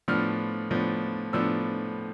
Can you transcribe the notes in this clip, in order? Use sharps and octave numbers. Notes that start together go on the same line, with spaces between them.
A2 F3 B3 D4 F6
A2 F3 B3 D4
A2 F3 B3 D4 E6